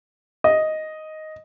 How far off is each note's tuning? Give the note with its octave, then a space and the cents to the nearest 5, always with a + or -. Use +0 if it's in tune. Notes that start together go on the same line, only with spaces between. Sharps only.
D#5 +5